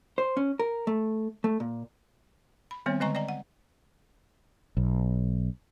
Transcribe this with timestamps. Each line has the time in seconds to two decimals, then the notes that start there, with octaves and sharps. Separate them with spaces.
0.18 C5
0.37 C#4
0.59 A#4
0.87 A3
1.44 A3
1.60 A#2
2.71 B5
2.86 D#3 G3 B3 C4 C#5
3.00 D3 G#3 D#5 G#5 A#5 C#6
3.15 D5 D#5 G5 A#5
3.28 F#5
4.77 B1